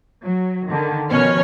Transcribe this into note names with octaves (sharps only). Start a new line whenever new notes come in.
F#3
D3 D#3
B2 D#3 F3 C#4 C#5 F6